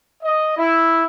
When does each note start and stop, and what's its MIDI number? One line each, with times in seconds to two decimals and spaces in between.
0.22 0.55 75
0.55 1.03 64